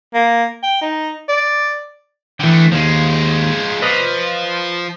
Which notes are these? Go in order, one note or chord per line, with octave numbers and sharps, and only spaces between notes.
A#3
G5
D#4
D5
D3 E3 A3 G5
D#2 F3 G#3
F3 B4 D5 D#5